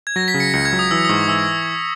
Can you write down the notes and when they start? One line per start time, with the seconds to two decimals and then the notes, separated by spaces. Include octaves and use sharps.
0.07 G#6
0.16 F#3 A#6
0.28 B6
0.34 C#3
0.40 C#7
0.53 C#2 C#7
0.65 G#6
0.73 F#3
0.79 D#6
0.91 E3 E6
1.05 D#6
1.09 G#2 C#6
1.28 E3 E6